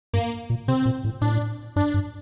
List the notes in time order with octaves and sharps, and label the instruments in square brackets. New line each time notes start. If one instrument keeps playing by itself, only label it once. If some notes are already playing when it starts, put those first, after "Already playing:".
[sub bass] G2 [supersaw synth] A#3
[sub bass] A#2
[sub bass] C3 [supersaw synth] C4
[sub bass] A#2
A2
[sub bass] A2 [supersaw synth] D4
[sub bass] G2 [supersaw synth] D4
[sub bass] G2